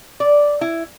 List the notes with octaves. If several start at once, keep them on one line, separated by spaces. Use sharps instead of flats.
D5
E4